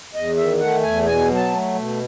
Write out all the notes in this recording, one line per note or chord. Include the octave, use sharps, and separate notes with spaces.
E2 D#5
D#3 E5
A3 F#5
E2 G#5
B2 G#5
F#3
A5
A3
B2